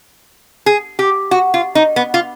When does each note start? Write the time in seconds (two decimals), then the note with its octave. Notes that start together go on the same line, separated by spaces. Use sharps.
0.66 G#4
0.99 G4
1.31 F#4
1.54 F4
1.75 D#4
1.96 B3
2.14 F4